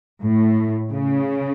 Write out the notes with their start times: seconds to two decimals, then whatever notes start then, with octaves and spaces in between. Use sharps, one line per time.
0.23 A2
0.91 C#3